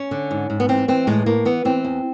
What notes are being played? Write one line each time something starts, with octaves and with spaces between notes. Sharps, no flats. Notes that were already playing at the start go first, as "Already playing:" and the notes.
Already playing: C#4
D3
G#2
G#2
B3
E3 C4
E3 C4
A2 G#3
A2 A#3
E3 B3
E3 C4
E2